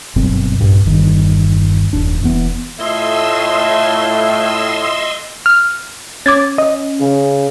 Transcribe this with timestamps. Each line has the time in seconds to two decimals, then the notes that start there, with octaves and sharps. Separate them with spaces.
0.16 G1 F#2 B2 C4
0.59 A#1 G2 A#2
0.85 G1 E2 G2 D#3
1.93 D#1 F#2 D4
2.22 E1 E2 B3
2.80 A2 A3 E4 F4 D#5 C6 E6
5.46 F6
6.26 C#4 D6 G#6 A6
6.58 D#5
7.01 C#3